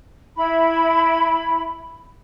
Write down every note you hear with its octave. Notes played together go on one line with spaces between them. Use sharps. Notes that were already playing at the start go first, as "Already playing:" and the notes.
E4 B5